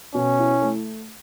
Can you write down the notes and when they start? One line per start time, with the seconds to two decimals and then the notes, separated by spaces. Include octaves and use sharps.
0.14 B2 C#4
0.39 E4
0.62 A3